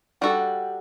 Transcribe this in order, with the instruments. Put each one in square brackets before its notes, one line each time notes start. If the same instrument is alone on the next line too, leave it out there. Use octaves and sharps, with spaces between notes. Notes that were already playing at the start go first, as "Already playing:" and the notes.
[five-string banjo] G3 D4 F#4 A4 [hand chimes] F#5
[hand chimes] G5
F#5